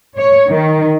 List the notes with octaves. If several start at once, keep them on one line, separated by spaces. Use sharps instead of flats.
C#5
D#3